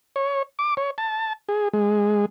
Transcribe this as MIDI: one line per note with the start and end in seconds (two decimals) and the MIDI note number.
0.16 0.43 73
0.59 0.74 86
0.77 0.90 73
0.98 1.33 81
1.49 1.68 68
1.73 2.26 56